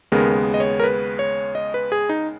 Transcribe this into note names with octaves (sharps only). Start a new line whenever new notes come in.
D#2 C#3 G#3 B3 A#4
D#5
C#5
A#4
B4
C#5
D#5
B4
G#4
D#4